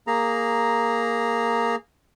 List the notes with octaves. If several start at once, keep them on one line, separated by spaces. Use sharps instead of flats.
A#3 G#4 A#5